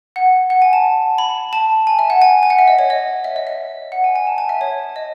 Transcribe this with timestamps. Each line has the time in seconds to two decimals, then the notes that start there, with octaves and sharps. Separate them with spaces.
0.16 F#5
0.50 F#5
0.62 G#5
0.73 A5
1.18 B5
1.53 A5
1.87 G#5
1.99 E5
2.10 F#5
2.22 G#5
2.43 G#5
2.50 F#5
2.59 E5
2.68 D#5
2.79 C#5
2.90 D#5
3.24 E5
3.36 D#5
3.47 E5
3.92 F#5
4.04 G#5
4.16 G#5
4.27 A5
4.38 G#5
4.49 E5
4.61 C#5
4.96 D#5